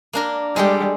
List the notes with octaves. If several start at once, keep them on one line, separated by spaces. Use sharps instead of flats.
A#3 D4 A#4
G3 G#3 A4 G5